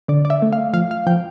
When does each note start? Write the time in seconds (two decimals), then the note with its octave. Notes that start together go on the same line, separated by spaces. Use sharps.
0.08 D3 D5
0.25 D5
0.30 E5
0.42 A3
0.53 F5
0.74 F3 F5
0.91 F5
1.07 F3 G5